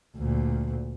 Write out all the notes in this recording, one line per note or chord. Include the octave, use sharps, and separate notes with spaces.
D2 A#2